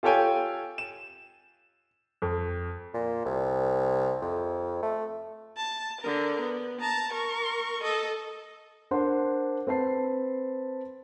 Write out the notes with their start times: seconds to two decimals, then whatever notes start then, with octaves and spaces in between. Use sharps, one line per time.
0.03 F4 G4 A4 C#5 G5 G#5
0.78 E7
2.22 F2
2.94 A#2
3.25 C2
4.22 F2
4.83 A3
5.57 A5
6.01 D3 A#4
6.40 B3
6.81 A5 A#5
7.12 A#4 C#6
7.83 A4 D#5
8.91 D4 A#4 C5 F#5 C6
9.67 C4 B4 A5 C7